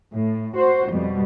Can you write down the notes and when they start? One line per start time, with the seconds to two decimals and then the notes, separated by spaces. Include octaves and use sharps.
0.14 A2
0.57 F#4 C5
0.90 F2 B2 G3